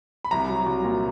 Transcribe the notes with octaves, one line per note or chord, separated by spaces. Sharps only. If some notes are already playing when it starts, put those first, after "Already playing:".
B5
C2 A#5
F#3
C2
A#2